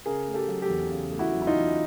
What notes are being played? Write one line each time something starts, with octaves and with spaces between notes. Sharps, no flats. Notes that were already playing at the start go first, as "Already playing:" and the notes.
C#3 G#4 A#4
A3
G4 A4
F#3
G4 A4
E2
C#3
A3
E4 F#4
F#3
E4
D#4 F4
E2